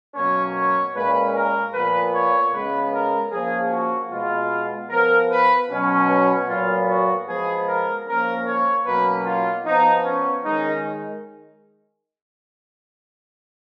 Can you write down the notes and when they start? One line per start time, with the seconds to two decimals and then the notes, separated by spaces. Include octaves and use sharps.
0.15 B2 F#3 A#3 C#4 C#5
0.55 C#5
0.95 A#2 G#3 C#4 B4
1.35 A#4
1.73 A#2 F3 B3 B4
2.14 C#5
2.53 C#3 G#3 B3 B4
2.93 A#4
3.31 F3 A#3 C#4 G#4
3.71 F#4
4.11 B2 G#3 B3 F4
4.90 F3 B3 A#4
5.30 B4
5.70 B2 F#3 C#4
6.08 B4
6.48 A#2 F#3 B3 F4
6.88 F#4
7.27 F3 G#3 B3 G#4
7.67 A#4
8.06 F3 A#3 C#4 A#4
8.46 C#5
8.85 B2 F#3 A#3 C#4 B4
9.25 F4
9.65 F3 B3 D#4
10.04 C#4
10.44 D#3 G#3 C#4 D#4